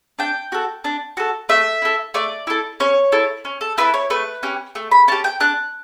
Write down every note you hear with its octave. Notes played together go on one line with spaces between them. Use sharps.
D4 G5
F#4 A4
D4
F#4 A4
A3 E5
E4 A4
A3 D5
E4 A4
C#4 C#5
E4 A4
C#4
A4
E4 A4 B4
C#5
A3 B4
C#4 G4
A3
B5
C#4 G4 A5
G5
D4 F#6